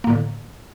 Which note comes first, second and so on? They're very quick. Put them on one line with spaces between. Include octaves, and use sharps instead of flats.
A#3 A2 D3